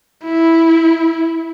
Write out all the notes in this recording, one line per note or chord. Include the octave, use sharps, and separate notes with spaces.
E4